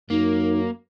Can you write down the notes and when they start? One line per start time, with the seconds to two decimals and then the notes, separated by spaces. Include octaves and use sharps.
0.10 F#2 A#3 D#4